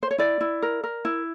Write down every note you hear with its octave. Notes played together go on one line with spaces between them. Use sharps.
C5
C#5
E4 D5
E4
A#4
A#4
E4